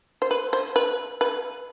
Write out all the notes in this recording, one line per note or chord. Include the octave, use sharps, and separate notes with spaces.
C5
B4
C5
B4
B4